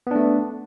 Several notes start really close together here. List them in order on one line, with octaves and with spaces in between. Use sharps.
B3 D4 A3